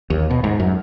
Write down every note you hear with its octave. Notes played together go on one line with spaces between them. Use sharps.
D#2
B2
G#2
F#2